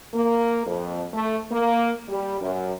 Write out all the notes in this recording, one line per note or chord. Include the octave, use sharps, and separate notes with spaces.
A#3
F2
A3
A#3
G3
F#2